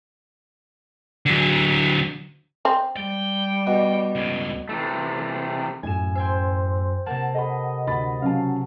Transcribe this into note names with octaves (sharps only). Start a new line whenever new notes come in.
D3 F#3
C4
G3 G5
B2
C#2 A2
C3 E3 A3
F#2 A2 G#5 E7
C5 G5 G#5 C6 E6
C3 A#3 F#5 A5
A4 D#5 A5 B5
D2 B5 A6
C#3 F#3 F5 A5